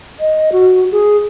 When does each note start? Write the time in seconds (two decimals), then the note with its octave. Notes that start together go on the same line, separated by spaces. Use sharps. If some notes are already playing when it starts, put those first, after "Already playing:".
0.20 D#5
0.52 F#4
0.92 G#4